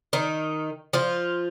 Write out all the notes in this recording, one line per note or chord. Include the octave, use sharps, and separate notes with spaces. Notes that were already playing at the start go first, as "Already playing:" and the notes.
D#3 D#4
F3 F4